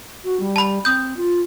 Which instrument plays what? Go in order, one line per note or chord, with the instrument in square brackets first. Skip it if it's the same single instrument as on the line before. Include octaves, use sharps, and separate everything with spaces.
[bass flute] F#4
G3
[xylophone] A5 B5
[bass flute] C4 [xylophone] D#6 G6
[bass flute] F4